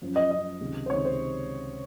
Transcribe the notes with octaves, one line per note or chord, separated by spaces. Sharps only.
F#2 F3
D#5
F#2 F3 D#5
C#2 C3 D#3
C5
C#2 C3 D#3 C#5
C5